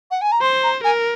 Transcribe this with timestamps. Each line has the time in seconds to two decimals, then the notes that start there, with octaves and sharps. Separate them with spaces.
0.10 F#5
0.21 G#5
0.31 A#5
0.41 C5 C6
0.63 A#5
0.84 A#4 G#5